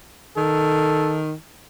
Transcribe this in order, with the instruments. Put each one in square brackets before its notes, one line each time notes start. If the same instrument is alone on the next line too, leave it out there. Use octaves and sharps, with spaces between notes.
[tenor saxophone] D#3 [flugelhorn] A4